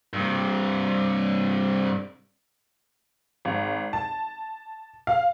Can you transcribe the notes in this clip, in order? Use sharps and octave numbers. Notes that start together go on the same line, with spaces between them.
G2 C3
G#1
A5
F5